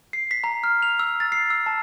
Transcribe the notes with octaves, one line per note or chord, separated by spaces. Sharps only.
C7
B6
A#5
F6
F7
E6
A6
C7
E6
A5